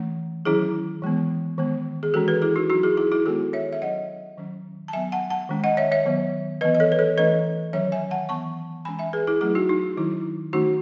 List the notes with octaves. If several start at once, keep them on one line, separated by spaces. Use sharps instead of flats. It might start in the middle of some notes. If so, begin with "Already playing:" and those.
Already playing: E3 A3 C#4
D#3 F#3 C#4 E4 G#4
E3 G#3 B3
D#3 G#3 B3
G#4
E3 G#3 C#4 F#4 A4
G#4 B4
E4 G#4
D#4 F#4
F#3 C#4 D#4 F#4
E4 G#4
E4 G#4
E4 G#4
D#3 G#3 B3 F#4 A4
C#5 E5
E5
F#3 C#4 D#5 F#5
D#3 F#3 C#4
A5
F#3 B3 E5 G#5
F#5 A5
F#5 A5
D#3 G#3 C#4
D#5 F#5
C#5 E5
C#5 E5
D#3 F#3 B3
E3 B3 B4 D#5
D#5
A4 C#5
B4
A4 C#5
E3 A3 C#4 B4 D#5
D#3 F#3 C#4 C#5 E5
E5 G#5
F#5 A5
E3 B3 A5 C#6
E3 G#3 C#4 G#5 B5
E5 G#5
G#4 B4
E4 G#4
F#3 A3 C#4 E4 G#4
D#4 F#4
D#4
D#3 F#3 C#4 E4
D#3 A3 C#4 D#4 F#4